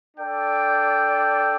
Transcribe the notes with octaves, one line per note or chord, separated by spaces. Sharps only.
D4 A4 D5 G5